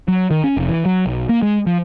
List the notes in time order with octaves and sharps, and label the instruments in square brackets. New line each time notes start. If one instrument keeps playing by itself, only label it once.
[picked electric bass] F#3
D#3
C#4
F1
E3
F#3
B1
A#3
G#3
F3